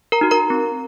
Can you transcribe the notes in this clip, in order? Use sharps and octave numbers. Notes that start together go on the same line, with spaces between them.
A#4 A#5
D#4 F#4
A#4 A#5
C4